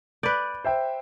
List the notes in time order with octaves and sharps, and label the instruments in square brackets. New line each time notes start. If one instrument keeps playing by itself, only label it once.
[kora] B4 D5 [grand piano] G6
[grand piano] C5 E5 G5